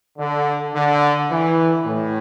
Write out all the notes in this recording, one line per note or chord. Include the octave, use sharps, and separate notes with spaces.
D3
D3
E3
A2